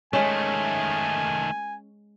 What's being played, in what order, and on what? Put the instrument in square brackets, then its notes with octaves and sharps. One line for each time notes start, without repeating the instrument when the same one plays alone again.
[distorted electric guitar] D#3 A3 [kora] G#3 C#4 [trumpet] G#5